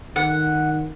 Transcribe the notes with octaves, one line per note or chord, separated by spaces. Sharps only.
D#3 F#5